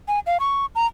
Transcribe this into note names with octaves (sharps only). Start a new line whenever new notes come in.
G#5
F5
C#6
A#5